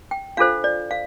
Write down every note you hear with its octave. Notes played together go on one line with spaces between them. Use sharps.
G5
D4 F4 A4 C5 F5
D5
F5